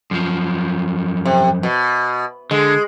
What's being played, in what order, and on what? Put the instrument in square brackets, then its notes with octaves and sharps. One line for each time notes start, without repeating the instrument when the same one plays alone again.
[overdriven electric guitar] F#2 F3
[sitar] C3
B2
[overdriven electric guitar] D3 [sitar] G#3